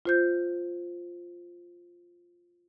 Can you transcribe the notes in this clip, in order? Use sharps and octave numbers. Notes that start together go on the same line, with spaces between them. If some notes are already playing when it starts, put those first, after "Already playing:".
F4 C5 G6